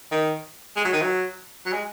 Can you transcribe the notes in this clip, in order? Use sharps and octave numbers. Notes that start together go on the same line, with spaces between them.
D#3
G#3
F#3
D#3
F#3
F#3
G#3